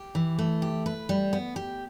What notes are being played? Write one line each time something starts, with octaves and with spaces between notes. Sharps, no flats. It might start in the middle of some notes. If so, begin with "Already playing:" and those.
Already playing: G4
E3
A3
G4
B4
G3
B3
G4